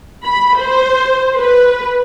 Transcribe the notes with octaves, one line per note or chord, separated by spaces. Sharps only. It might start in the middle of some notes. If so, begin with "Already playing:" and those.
B5
C5
B4